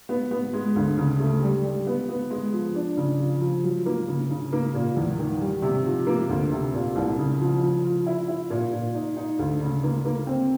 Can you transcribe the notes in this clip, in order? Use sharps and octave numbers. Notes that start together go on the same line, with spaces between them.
B3
B3
G#3
D2
C#3
A3
G3
G3
B3
B3
G#3
F3
D4
C#3
F3
F3
F#3
A#3
C#3
C#3
A#3
A#2
E2
D#3
G3
C3
F3
A#3
D2
C3
A#2
C2
C#3
F3
F3
F3
E4
E4
A#2
A#2
D#4
D#4
D2
C#3
A#3
A#3
C4